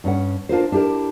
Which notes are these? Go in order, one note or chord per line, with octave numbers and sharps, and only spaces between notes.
G2 C#4 F#5
D4 F4 A#4 C5
D4 E4 G4 A4 A#4